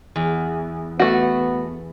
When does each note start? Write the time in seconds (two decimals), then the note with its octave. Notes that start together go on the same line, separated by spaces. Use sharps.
0.16 E2
1.00 A3 B3 F#4